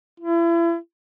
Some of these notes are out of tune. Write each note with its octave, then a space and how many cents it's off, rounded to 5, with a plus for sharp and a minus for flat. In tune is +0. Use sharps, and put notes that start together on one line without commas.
E4 +35